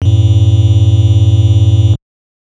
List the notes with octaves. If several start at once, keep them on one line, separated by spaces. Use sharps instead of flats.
F#2 A2